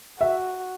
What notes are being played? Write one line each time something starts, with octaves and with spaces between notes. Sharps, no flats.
F#4 E5